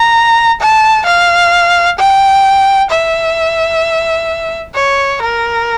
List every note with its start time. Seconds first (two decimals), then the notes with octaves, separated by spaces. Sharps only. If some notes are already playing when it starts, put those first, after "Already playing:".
Already playing: A#5
0.61 A5
1.06 F5
1.99 G5
2.91 E5
4.75 C#5
5.22 A#4